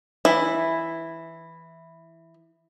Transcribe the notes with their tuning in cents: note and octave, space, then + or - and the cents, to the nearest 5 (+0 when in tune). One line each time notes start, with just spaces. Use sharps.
E3 +0 E4 +0